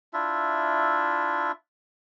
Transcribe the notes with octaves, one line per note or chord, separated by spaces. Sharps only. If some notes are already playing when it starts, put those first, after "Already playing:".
D4 E4 F4 E5